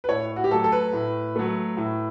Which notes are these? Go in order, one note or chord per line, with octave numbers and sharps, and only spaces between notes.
B4
A2 C#5
F#4
G4
F#3 A3 A4
A4
B4
A2
F#3 A3
A2